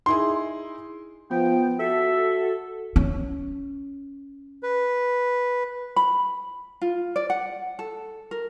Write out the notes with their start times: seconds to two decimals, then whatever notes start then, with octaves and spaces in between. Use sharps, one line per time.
0.06 D#4 E4 G#4 C6
1.31 F3 B3 G5
1.79 F#4 A4 E5
2.96 C#4
4.63 B4
5.96 B5
6.82 F4
7.16 D5
7.30 F#5
7.79 A4
8.31 A#4